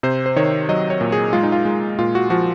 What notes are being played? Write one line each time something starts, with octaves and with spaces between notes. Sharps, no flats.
C3 C5
C5
D#3 C#5
F#3 D#5
C#5
A#2
G#4
G#3 F4
D#4
F4
G#3
A#2 F4
F#4
F3 F#4